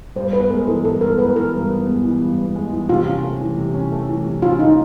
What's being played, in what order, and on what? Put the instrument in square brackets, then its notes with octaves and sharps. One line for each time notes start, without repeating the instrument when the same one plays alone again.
[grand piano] G2 [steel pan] C5
[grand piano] B3 [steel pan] B4
[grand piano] G#3 [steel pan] A#4
[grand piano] E3 [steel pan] A4
[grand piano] G2 [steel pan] A4
[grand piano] B3 [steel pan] A#4
[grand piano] G#3 [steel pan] B4
[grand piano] E3 [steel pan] A#4
[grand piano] G2
B3
G#3
E3
G2
B3
G#3
E3
[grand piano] C3 [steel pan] F4
[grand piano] C#4
A3
E3
C3
C#4
A3
E3
C3
[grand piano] C#4 [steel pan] F4
[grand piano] A3 [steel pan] D#4